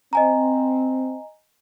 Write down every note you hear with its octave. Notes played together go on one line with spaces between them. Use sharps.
C4 D#5 G#5 A#5